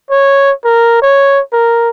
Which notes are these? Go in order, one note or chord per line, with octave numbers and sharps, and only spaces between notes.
C#5
A#4
C#5
A#4